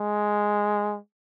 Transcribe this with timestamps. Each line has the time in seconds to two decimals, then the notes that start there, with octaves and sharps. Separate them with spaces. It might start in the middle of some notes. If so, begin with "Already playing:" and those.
Already playing: G#3